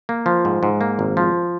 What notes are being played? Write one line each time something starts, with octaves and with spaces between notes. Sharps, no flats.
A#3
F3
G#2
G#2
A#3
G#1
F3